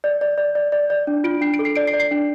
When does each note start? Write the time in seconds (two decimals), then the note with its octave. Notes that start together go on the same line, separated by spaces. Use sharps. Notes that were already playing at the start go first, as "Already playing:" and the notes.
0.04 D5
0.21 D5
0.38 D5
0.55 D5
0.72 D5
0.90 D5
1.07 D4
1.24 F4 D7
1.41 D4 C7
1.54 D7
1.59 A4
1.65 C7
1.76 D5 D7
1.87 C7
1.93 D5
2.00 C7
2.11 D4